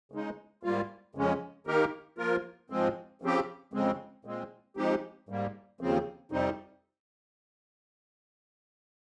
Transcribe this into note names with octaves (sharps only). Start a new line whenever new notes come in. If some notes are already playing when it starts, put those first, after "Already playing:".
C#3 G#3 D#4
G#2 G3 A#3 F4
F2 C#3 G#3 C#4
D#3 A#3 D#4 G4 A#4
F3 A#3 F4 A#4
G#2 F3 G#3 C4
C#3 F3 C4 G4
F2 C#3 G#3 C4
A#2 G#3 C4
F3 G#3 C4 D#4 G4
G#2 G3 A#3
D#2 C#3 F3 C4
F2 C3 G3 C4 D#4